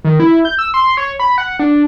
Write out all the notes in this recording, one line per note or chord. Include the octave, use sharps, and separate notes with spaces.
D#3
E4
G6
E6
C6
C#5
B5
F#5
D4